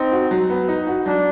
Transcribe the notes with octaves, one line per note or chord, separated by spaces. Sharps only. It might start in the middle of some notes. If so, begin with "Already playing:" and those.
Already playing: C4 D#4
F#4
F#3
B3
D#4
F#4
F#3 D4